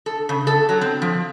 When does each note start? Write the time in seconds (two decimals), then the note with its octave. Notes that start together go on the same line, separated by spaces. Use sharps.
0.06 A4
0.29 C#3
0.47 A4
0.69 F#3
0.81 C4
1.02 F3